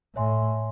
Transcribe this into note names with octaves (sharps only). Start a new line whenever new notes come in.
A2 C#5 E5 G#5 C6